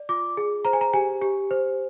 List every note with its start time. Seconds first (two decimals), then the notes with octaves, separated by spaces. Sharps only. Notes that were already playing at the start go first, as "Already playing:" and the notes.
Already playing: D5
0.09 F4 D6
0.37 G#4
0.65 C5 A#5
0.73 G#5
0.81 A#5
0.93 G4 G#5
1.22 G4
1.51 C5